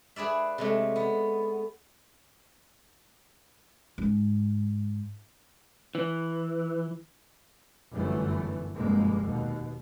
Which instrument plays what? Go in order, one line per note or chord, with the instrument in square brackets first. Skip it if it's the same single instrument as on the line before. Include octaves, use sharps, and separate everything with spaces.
[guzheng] G#4 B4 D5 E5
C3 G#3 A3
B3
[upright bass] G#2
[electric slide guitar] E3
[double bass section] G1 F#2 E3 A3
F1 G2 B2 G#3 A#3
D#2 B2